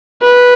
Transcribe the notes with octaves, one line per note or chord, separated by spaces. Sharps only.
B4